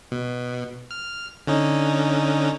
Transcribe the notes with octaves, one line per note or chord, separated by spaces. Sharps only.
B2
F6
D3 C#4 D#4